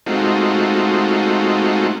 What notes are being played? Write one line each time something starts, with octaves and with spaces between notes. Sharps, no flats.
G#3 A3 C4 D#4 F4 F#4